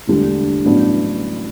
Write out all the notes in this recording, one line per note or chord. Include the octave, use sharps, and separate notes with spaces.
E1 D2 D3 G3 D4
A1 G2 F#3 B3 D4